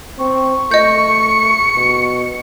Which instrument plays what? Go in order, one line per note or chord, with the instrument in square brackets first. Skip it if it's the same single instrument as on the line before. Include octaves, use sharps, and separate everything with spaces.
[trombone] C4 [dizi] C#6
[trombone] A3 [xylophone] D#5 G6 [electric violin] C#7
[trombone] B2